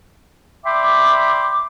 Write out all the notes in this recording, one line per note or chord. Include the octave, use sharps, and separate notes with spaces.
D5 E5 G5 B5 C6 D6